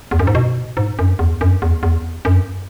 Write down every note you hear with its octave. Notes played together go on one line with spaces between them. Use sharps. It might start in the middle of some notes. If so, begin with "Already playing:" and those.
E2
F#2
G#2
B2
G#2
F#2
E2
F#2
E2
E2
F#2